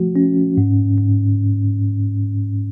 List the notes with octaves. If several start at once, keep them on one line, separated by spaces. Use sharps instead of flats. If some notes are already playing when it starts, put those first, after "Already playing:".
Already playing: F3 A3 F#4
C#4
G#2
G#2